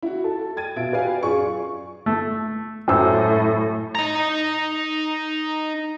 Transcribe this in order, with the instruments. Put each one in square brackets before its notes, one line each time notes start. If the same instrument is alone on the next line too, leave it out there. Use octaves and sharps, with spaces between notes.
[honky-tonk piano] E4 F#4
A4 A5
G5 G#6 A6 D#7
B2 F4 E5 D7
F#4 G4 B4 D5 F5 G#5
F#2 F4 G#4 D5 C#6
[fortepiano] A3
[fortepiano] F#2 C5 E6 [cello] A2
[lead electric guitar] D#4 A#5